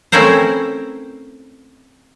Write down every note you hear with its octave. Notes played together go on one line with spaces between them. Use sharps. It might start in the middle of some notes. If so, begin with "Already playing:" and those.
A3 C4 C#4 E4 A#4 C5